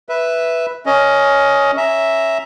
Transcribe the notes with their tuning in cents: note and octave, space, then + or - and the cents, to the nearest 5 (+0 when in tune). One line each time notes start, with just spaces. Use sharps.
B4 +0 E5 +0
C#4 +15 A#4 +0 D#5 +15
C#4 +0 E5 +0 A#5 +0